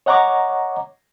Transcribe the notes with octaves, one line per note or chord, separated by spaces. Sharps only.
C#5 D#5 F#5 A#5 C#6 D6